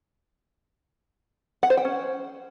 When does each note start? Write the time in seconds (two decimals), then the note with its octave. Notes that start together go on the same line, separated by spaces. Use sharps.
1.63 F#5
1.70 C5
1.77 G5
1.85 C#4